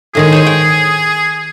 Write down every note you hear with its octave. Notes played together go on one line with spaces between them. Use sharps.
A2 D#3 G#3 G#4
C5 C#5 G#5
G5